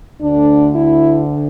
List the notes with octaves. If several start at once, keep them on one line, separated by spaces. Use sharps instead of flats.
D2 D3 D4
E4